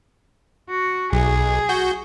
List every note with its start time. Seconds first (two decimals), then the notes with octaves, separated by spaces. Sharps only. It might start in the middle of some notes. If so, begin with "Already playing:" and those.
0.70 F#4
1.13 B1 G#4
1.69 F#4 G6